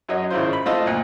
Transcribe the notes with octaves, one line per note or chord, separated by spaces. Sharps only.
F#2 F#3 F#4 C#5 D#5
G#1 C#3 E4 F4 C5
B5
A3 C4 F4 D#5 A5 E6
D2 A#2